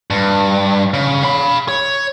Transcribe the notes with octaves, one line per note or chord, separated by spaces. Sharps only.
G2
C#3
F5 B5
C#5